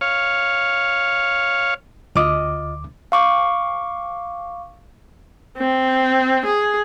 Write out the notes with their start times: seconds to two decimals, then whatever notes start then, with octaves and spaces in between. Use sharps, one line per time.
0.01 C#5 F5
2.15 D2 F4 D#5 D6
3.12 F5 C#6 D6
5.58 C4
6.46 G#4